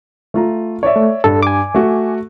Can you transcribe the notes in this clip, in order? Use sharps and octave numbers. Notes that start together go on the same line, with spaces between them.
A3 F4 A#5
C#5 D5 E5
A3
G2 A4
G#5 D6
A3 F#4